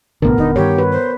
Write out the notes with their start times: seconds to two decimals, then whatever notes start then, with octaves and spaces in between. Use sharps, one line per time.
0.22 B1 A2 D3 B3 A#4
0.38 D#1 D3 D#4
0.56 G2 D#3 G4 C#5
0.79 B4
0.92 C5